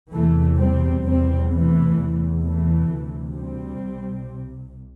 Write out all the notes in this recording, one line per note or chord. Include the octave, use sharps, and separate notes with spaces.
E2 C3 E3 A3
G3 C4
E2 C3 G3 C4
E3 A3
E2 C3
E3 A3
D2 C3
G3 C4
C2 C3